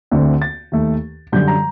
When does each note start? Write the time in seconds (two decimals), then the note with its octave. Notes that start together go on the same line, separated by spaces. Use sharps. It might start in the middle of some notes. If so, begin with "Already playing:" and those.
0.11 D2 D3 A3 C4
0.42 A6
0.72 D#2 D#3 A3
1.32 F#2 D3 G3 G6
1.48 A#5